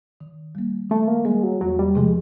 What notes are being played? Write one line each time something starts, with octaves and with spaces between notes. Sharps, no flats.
D#3
G3 A#3
D#3 A3
A#3
G3 G#3 A#3
F#3
E2 F#3
G3
C3 F3 G#3 A3